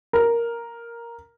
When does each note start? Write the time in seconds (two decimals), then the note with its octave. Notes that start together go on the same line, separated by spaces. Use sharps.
0.13 A#4